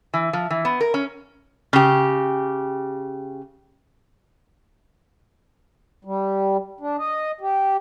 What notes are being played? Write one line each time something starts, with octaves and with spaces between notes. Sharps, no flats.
E3
F3
E3
B3
A#4
C#4
C#3 G4
G3
D4
D#5
G4